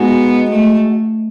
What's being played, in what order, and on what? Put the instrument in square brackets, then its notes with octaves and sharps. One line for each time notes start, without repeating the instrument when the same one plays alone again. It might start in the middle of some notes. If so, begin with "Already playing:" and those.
Already playing: [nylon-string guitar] G#3 D#4 F#4 [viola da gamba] B3
[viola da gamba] A3